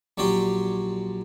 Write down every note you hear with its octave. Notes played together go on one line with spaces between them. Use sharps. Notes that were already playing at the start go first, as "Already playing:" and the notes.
A#1 F#3 C#4 G4 D5 C6